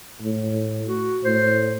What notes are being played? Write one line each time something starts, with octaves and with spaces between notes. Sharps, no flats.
A2
F#4
A2 C5